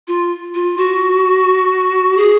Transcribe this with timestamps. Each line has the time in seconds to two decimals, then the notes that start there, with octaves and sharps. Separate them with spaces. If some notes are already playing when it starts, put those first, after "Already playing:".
0.08 F4
0.55 F4
0.77 F#4
2.17 G#4